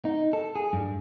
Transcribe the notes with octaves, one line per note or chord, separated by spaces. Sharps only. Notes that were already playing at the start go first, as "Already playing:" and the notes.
D#4
A4
G#4
G2